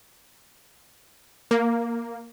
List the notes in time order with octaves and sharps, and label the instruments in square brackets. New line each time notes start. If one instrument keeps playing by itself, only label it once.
[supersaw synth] A#3